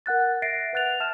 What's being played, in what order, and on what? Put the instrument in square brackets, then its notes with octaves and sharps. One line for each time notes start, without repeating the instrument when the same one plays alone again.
[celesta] A#4 F#5 F#6 A6
E5 A6 A#6 C7 D7
B4 F#5 F#6 A6 F7
E5 A5 F6 G6 E7